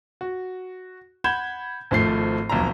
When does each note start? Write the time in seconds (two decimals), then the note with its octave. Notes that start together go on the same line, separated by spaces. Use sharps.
0.21 F#4
1.24 F#5 B5 G6 G#6 E7
1.91 G#1 F3 A3 C7
2.49 D#1 B1 F2 A#5